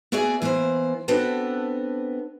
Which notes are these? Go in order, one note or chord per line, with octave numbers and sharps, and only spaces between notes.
B3 F#4 G#4 D5 E5 G#5
E3 A#3 B3 B4 C5
B3 C4 D4 F#4 A4 B4